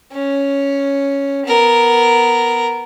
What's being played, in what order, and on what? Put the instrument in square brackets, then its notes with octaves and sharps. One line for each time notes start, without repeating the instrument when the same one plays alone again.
[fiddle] C#4
B3 A#4